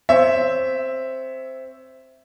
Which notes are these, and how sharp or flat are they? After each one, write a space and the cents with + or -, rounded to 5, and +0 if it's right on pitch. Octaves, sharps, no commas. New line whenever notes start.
C4 +0 C#5 +15 E5 +0